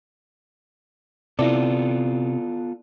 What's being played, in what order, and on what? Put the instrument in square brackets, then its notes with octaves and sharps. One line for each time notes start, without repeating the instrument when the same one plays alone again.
[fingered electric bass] C3 [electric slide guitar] B3 F4 A4 [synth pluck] E4 D5